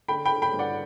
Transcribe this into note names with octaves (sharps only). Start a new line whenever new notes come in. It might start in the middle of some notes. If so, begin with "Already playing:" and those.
D3 G5 B5
G5 B5
D3
G5 B5
G2
D5 F#5